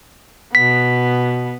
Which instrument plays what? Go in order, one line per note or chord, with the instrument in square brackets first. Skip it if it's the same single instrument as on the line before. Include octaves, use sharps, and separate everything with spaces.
[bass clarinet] B2 [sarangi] B3 [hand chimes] B6